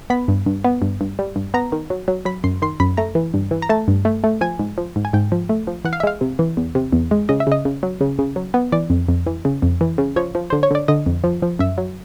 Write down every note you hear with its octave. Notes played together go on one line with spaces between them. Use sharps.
B3 B5
G2
G2
B3
G2
G2
G3
G2
B3 A#5
D#3
F#3
F#3
F#3 B5
F#2 C6
D#3 C6
F#2 B5
A3 A#5
E3
G2
E3
A#5
A3 A5
G2
A3
A3
F3 G#5
G#2
F3
G#2
G#5
G#2 G5
F3
A3
F3
E3 F#5
F5
E5
G#3 F5
C3
E3
E2
C3
E2
G#3
C#3 D#5
E5
C#3 D#5
C#3
F#3
C#3
C#3
F#3
B3
E3 D5
F2
F2
E3
C#3
F2
E3
C#3
F3 C#5
F3
D3 C5
C#5
D3 D5
D3 D#5
F2
F3
F3
F#2 E5
F#3